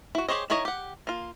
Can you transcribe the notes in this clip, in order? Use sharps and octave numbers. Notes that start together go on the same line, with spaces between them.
E4 F#4
G4 G#4 C5 C#5 D#5
D#3 E4 A#4 C#5 D#5
G4 F#5
A#3 F4